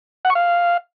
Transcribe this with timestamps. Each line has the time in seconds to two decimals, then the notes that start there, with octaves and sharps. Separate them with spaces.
0.25 F#5
0.30 C#6
0.35 F5